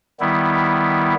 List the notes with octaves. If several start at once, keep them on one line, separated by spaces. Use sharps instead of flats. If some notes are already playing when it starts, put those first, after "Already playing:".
D#3 G3 B3 E4